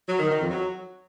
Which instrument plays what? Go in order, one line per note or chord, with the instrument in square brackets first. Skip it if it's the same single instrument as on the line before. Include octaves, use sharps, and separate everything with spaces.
[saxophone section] F#3
D#3
D#3
F2
F#3